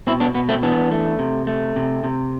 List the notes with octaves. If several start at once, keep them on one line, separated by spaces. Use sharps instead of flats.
B2 C4 E4
B3 D4
B2 B3
A3 C4
E3 B3 D4
A3
C3
A3
C3
C3